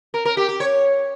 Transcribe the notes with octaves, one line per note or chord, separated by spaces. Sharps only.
A#4
A#4
G4
G4
C#5